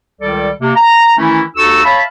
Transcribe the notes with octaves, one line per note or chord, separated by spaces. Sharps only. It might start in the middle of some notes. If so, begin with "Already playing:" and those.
C#2 D#3 G3 A4 D5
C3 A#3
A#5
D#3 E3 A3 C#4 E4
D#2 D#4 F#4 A4 C#6 E6
C#5 E5 F5 A5 B5